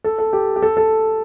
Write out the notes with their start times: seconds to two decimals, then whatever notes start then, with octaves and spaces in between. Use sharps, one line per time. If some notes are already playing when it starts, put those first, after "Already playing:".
0.04 A4
0.19 A4
0.33 G4
0.56 G4
0.62 A4
0.77 A4